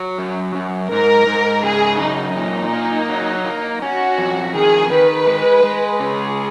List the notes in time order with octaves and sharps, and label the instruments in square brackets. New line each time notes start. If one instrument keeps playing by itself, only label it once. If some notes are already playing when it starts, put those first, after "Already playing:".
Already playing: [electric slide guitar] F#3
F#2
F#2
[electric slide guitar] G#2 [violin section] A#4
[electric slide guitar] G#2
[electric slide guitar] C#3 [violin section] G#4
[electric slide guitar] F#2 [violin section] D#4
[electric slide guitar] A#2 [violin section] D#4
[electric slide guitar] A#3
F#3
A#3
[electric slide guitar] C#4 [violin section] F#4
[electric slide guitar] F2
[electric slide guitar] D#3 [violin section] G#4
[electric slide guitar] D#3 [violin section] B4
[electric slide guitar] G#3
G#3
[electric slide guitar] C#3 [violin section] G#4